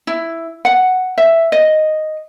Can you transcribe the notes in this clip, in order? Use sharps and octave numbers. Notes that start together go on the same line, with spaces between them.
E4
F#5
E5
D#5